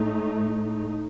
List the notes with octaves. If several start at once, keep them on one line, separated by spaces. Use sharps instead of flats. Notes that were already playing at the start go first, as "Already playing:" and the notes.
Already playing: A2 A3 D#4